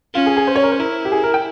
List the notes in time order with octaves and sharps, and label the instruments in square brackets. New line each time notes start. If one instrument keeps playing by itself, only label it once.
[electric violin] C#4 [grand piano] F4
[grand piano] G#4
G#4
C5
C#5
A#4
C5
[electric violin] E4 [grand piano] A#4
[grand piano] G4
G#4
A#4
G5